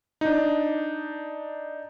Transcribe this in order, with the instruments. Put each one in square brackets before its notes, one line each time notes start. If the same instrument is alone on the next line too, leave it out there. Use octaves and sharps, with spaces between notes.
[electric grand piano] D4 D#4